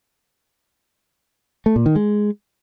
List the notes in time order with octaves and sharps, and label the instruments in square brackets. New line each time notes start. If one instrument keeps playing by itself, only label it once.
[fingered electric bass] A3
A#2
D#3
G#3